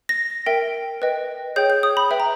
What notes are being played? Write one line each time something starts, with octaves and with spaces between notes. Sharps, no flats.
A#6
A#4 E5 G5
B4 D#5 G5
G#4 C#5 G5 G6
G6
D#6
B5
B4 E5 G5
A#5